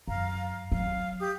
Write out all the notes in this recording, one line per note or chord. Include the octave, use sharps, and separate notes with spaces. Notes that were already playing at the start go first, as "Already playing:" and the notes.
F#2 F5 A#5
F#3 F5
G4 D#6